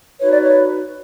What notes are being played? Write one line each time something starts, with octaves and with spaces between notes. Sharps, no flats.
D#4 F#4 B4 C#5
D5
C#5